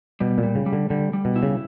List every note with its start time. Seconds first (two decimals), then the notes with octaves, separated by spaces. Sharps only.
0.20 B2 G3
0.38 A#2
0.43 G3
0.55 C#3
0.66 G3
0.73 D3
0.90 D3 G3
1.13 G3
1.25 B2
1.36 E4
1.43 C#3